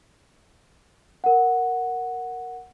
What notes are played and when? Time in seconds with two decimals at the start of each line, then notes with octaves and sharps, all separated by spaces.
1.24 A#4 F#5